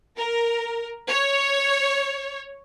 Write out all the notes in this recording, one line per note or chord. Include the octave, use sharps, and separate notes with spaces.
A#4
C#5